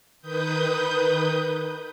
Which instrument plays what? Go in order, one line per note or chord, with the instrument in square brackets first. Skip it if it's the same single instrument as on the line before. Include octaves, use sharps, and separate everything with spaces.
[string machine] D#3 B4 D#6 G6